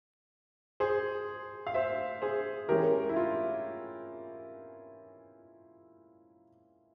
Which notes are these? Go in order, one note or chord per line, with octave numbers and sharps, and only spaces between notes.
G#4 C5
F5
C5 E5
G#4 C5
E3 G#3 C#4 G4 A#4
E4
F4